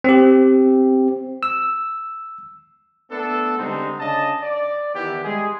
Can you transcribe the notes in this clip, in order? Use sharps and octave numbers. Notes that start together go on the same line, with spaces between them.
C4 G4
E6
A3 B3 D4 A4
D3 G3 G#3 C4 D#4
C#3 D4 D#5 A5
D5
D#3 E3 B3 E4 G4
G3 G#3 G#4